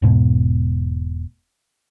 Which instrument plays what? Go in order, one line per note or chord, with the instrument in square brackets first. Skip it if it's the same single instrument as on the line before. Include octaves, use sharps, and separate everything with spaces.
[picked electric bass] E1 G#2 B2